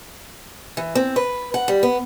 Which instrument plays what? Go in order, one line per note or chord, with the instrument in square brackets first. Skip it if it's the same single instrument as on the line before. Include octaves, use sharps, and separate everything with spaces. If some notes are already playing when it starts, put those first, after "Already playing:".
[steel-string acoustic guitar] E3
C4
B4
F#5
G3
B3